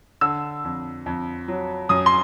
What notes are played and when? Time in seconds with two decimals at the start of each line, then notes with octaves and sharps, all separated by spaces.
0.21 D3 E6
0.64 F2
1.06 F2
1.48 F#3
1.89 F#2 D#6
2.06 C6